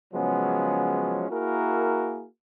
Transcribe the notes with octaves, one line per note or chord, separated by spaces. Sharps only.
C#3 F3 F#3 G#3 B3 C#4
A#3 E4 F#4 G#4 A#4